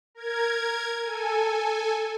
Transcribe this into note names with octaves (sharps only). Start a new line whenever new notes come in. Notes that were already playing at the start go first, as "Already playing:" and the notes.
A#4 G#6
A4 G#5